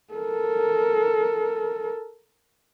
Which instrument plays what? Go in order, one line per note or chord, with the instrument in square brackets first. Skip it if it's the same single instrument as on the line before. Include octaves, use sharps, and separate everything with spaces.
[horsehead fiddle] A4 A#4